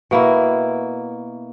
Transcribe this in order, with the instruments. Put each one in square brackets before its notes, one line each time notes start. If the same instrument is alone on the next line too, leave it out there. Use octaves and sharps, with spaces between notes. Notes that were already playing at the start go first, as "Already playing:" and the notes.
[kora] B2 A#3 E4